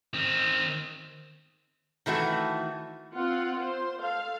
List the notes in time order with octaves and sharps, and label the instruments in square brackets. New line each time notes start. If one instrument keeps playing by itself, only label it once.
[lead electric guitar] D#3 C4
[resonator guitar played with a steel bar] D#3 E3 A3 F#4
[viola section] C4 F4 F#5
C5
A4 F5